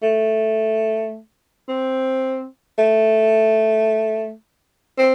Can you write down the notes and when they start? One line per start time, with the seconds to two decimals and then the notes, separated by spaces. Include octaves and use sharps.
0.03 A3
1.68 C4
2.78 A3
4.99 C4